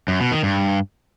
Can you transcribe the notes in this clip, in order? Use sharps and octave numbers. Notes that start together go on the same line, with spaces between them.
F#2
B2
D#3
G2